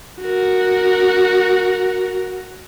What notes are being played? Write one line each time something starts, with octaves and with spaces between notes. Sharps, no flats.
F#4 A#4